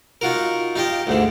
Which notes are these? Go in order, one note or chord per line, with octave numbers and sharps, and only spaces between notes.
D#4 F4 F#4 A#4
D#4 F4 G4 D#5
D2 G#2 D3